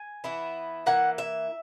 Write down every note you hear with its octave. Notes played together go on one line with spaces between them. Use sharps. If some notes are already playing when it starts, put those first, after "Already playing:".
Already playing: G#5
E3 B3 E4
E3 A#3 E4 F#5
E5